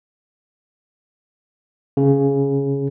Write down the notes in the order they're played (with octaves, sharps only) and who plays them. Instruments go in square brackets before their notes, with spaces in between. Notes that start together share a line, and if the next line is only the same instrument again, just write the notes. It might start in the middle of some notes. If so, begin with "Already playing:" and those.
[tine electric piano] C#3